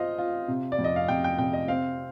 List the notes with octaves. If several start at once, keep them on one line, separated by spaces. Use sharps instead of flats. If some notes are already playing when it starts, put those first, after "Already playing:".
Already playing: F4 C5 D#5 F5
F4
C3
D5
F2
D#5
F5
F2 G5
G5
C3 G5
D#5
C4 F5